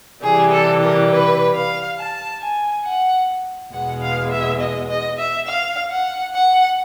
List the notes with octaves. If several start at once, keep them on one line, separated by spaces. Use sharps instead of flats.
C3 E3 G3 G#4
A4
A#4
B4
F5
A5
G#5
F#5
E2 B2 G#3 B3 F#5
F5
E5
D#5
D#5
E5
F5
F#5
F#5